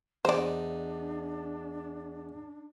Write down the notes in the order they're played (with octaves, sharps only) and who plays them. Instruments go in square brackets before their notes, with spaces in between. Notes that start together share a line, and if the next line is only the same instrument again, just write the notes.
[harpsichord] E2 D#4 [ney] D4 [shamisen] C5 D5